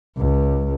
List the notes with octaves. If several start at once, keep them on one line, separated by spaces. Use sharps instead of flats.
C#2